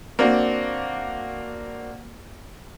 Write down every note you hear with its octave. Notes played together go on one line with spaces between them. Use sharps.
A#3 C4 D4 F#4